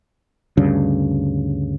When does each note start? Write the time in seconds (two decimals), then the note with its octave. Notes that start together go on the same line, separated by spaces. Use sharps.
0.57 D2 G2 C#3